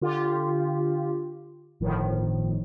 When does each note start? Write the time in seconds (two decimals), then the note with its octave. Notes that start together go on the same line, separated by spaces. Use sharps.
0.01 D3 F4 G4
1.80 G1 A2 D#3 F3